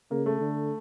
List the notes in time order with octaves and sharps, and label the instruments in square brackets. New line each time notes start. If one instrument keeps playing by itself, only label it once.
[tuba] C#3 [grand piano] A#3
[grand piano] A3
[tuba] D3